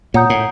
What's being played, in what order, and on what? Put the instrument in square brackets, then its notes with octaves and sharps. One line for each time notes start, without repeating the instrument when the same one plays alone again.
[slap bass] A#2 [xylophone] C#5 F#5 A#5 D#6 G6
[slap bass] A2